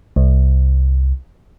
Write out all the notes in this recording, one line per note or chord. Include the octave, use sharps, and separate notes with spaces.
C2